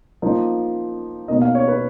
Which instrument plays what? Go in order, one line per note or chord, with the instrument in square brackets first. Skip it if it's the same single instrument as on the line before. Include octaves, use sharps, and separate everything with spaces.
[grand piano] F3 A#3 D#4
B2 A#3 D#4 D#5
F5
C#5
B4